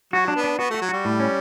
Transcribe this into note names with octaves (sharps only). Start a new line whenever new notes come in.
F#3 F#4
D4
B3
D4
B3 F#4
A3 F#4
F#3
G3 F#4
A2
C#4